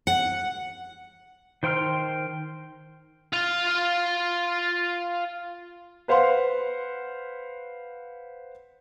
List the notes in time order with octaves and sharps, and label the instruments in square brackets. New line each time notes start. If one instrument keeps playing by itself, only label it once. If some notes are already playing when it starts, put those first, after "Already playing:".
[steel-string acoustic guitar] F#5
[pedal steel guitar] D#3 C5 G5 C6 F6
[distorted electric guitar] F4 F5
[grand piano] B4 C5 F5 F#5 C6